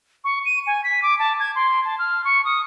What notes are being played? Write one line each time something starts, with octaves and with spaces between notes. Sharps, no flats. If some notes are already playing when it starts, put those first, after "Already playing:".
C#6
D#7
G#5
B6
D6
A5
G#6
C6
A5
F6
C#6
D#6